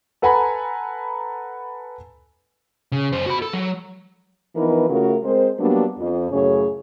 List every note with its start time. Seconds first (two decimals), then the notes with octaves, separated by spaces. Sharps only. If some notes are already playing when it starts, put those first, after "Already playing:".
0.22 A4 B4 F#5 G#5 A#5 B5
2.92 C#3
3.12 F#2 C5
3.26 F#4 B5
3.42 A4
3.53 F#3
4.56 E3 F3 B3 D#4 A#4 B4
4.89 C#3 A3 C#4 F4 F#4 A#4
5.24 G#3 C4 A#4 C5
5.60 F#3 G3 A#3 B3 D4
5.99 F2
6.32 F#2 A2 C#3 C#4 G#4 C#5